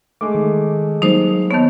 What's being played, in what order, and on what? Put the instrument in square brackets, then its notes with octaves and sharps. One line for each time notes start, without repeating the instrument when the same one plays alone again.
[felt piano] G#3 A3 [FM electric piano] D6
[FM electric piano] D#3
[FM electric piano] F#3 G3 A#3 [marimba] D#4 C5
[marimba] D#3 B3 [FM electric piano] C#5 A5